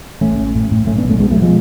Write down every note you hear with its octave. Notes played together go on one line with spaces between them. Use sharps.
A1 A3 C#4
A1
A2
A2
B1 A3 C#4
B3 D4
B1
A3 C#4
B2 G#3 B3
F#3 A3
B2
F3 G#3